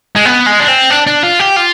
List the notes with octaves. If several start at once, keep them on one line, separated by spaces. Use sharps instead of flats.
G#3
B3
G#3
D4
C4
D4
D4
F4
G4
F4